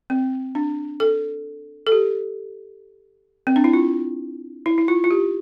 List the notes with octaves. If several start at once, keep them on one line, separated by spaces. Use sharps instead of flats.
C4
D4
A4
A4
G4
C4
D4
E4
F4
E4
E4
F4
F4
G4